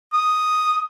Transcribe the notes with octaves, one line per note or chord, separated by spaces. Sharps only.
D#6